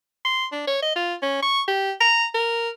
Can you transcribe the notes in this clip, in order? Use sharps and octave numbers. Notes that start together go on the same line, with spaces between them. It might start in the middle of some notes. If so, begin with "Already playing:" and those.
C6
D4
C#5
D#5
F4
C#4
C#6
G4
A#5
A#4